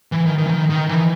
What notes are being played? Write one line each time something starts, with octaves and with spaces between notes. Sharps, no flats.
E3
D#3
D#3
E3
D#3
D#3
E3